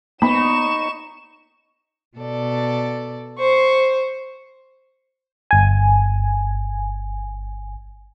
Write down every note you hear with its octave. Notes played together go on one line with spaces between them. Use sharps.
A#3 B3 D#4 B5 C#6 E7
B2 A4 D5
C5 C#6
G1 G#5